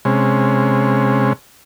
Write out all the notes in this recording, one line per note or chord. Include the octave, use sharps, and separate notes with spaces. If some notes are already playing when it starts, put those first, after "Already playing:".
C3 G#3 C#4